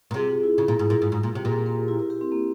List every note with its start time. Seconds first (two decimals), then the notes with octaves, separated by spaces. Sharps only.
0.11 A#2
0.14 C3 F4 G#4
0.29 F4
0.43 E4
0.58 C#3
0.68 A#2
0.79 G#2
0.90 A#2
1.02 G#2 F4
1.12 G#2
1.23 A#2
1.33 C3 G4
1.45 A#2 F4 G#4
1.66 G4 A#4
1.88 E4 G4
1.99 G4 A#4
2.10 G4 A#4
2.21 C4
2.32 A#3